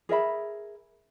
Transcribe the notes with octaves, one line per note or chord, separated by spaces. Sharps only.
G#4 A#4 E5 B5